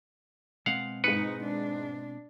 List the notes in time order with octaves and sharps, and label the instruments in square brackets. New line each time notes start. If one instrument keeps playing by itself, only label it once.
[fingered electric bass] B2 G#3 C4 [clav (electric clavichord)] F5 F#5
[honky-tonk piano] G#2 C#7 [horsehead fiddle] D#4 [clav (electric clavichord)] B4
[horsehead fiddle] D4